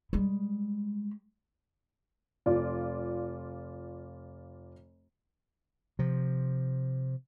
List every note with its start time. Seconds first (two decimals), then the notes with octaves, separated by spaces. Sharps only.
0.13 G3 G#3
2.46 F1 F4 D5
5.99 C3 F3